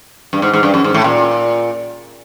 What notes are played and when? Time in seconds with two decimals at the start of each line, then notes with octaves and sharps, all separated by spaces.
0.33 G2
0.42 G#2
0.53 G#2
0.63 G2
0.74 F#2
0.84 G#2
0.94 A2
1.04 A#2